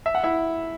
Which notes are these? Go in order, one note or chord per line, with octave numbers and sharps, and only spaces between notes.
E5
F#5
E4 E5